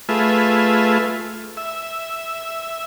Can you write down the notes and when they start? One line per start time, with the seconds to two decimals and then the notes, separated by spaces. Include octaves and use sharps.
0.09 A3 F4 G#4 B4 E5
1.57 E5